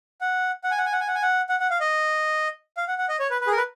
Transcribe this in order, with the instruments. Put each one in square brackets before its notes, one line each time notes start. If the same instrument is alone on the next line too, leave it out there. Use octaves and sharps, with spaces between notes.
[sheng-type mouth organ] F#5
F#5
G#5
F#5
G#5
F#5
G#5
F#5
G#5
F#5
F#5
F#5
F5
D#5
F5
F#5
F#5
D#5
C#5
B4
B4
G#4
A#4
B4